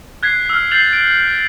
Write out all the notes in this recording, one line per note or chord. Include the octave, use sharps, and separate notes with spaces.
F#6 G#6 B6 C7
E6 F6
G6 A6 C7 F7 F#7
D7